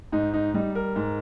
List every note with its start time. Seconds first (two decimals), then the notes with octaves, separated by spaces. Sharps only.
0.12 G#2 D#4
0.34 D#4
0.54 G3 D#4
0.75 A#4
0.96 G#2